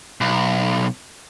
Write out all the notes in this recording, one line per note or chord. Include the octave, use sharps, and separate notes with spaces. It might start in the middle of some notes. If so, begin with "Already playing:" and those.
B1